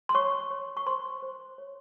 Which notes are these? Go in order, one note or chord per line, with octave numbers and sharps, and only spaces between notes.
C6
C#5 C#6
C#5
C#6
C5 C6
C5
C#5